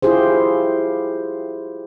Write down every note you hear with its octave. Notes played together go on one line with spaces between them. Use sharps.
E4 F4 G4 G#4 C5